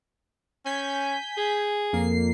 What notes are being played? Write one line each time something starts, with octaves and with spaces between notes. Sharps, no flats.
C#4 G#5 G6 B6
G#4
F2 A#3 C7